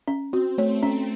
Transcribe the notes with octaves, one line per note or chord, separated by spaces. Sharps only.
C#4
C4 F#4
A3 C#5
C4
A3
C#4
C4